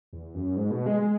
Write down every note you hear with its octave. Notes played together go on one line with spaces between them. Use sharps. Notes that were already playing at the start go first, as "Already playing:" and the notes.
E2
F#2
G#2
B2
G#3
G#3